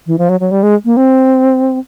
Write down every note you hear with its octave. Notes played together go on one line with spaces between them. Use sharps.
E3
F3
F#3
F#3
G3
G#3
A#3
C4